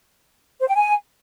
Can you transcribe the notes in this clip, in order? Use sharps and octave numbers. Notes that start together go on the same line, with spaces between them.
C5
G5
G#5